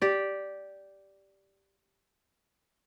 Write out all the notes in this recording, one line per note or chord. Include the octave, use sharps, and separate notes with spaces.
G4 D5